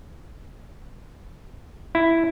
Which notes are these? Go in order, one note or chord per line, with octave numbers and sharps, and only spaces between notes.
E4